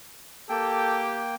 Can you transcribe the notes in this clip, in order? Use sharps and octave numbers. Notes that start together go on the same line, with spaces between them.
A#3 G4 A4 G5